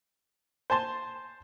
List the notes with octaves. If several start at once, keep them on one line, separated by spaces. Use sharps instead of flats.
C5 G#5 A5 C6